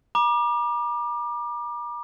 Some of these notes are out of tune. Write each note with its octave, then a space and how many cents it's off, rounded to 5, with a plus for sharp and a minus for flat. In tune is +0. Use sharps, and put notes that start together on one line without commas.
A#5 +45 D6 +25